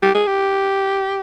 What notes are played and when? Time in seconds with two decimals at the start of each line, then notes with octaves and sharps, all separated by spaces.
0.03 G4
0.15 G#4
0.27 G4